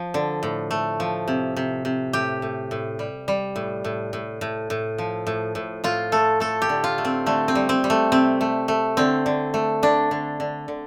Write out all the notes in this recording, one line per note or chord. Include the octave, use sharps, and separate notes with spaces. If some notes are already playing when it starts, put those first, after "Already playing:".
Already playing: F3
D3
A2
A3
F3
C3
C3
C3
A2 G4
A2
A2
G3
G3
A2
A2
A2
A2
A2
F3
A2
A2
A2 F4
A3 A4
A3 A4
G4
D3
F4
A3
C4
D3 A3
C4
G3
C4
G3
A3
C3 C4
A3
A3
D3 C4
D3
A3
D3 D4
D3
D3
D3